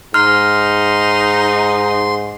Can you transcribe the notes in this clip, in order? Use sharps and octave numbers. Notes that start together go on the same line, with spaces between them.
G#2 D#4 C6 F6